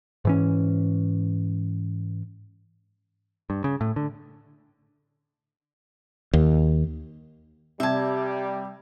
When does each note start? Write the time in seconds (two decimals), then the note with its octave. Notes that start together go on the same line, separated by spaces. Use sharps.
0.25 G#2 E3 C#4
3.50 G2
3.64 C#3
3.81 A2
3.96 D3
6.33 D#2
7.80 C3 G3 E5 A5 G#6